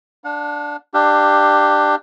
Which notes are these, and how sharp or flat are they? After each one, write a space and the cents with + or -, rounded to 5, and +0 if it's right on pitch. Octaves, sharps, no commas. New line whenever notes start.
D4 +0 F#5 -45
D4 +20 G4 +0 F5 -20